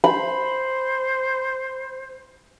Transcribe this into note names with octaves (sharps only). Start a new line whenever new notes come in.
C5 B5